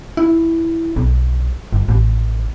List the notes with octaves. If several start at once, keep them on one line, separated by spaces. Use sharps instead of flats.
E4
B1
G1
A1